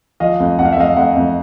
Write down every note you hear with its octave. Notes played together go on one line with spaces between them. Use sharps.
F3 D#5 F5
F2
F2 F#5
F5
E5
F2 D#5 F5
F2 E5 F#5
F2